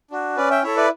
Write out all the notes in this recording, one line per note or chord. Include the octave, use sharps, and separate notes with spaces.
D4 F#4
C#4 B4 D5
E5 G5
E4 A4 C#5 E5
B4 D5